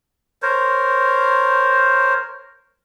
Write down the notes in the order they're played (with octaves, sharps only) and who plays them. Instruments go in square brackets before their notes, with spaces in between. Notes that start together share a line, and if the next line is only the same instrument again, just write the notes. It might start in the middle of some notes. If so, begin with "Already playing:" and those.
[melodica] A#4 C5 C#5